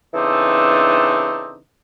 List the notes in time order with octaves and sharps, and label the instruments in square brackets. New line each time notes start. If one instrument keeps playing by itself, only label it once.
[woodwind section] C#3 E3 C4 D4 D#4 A4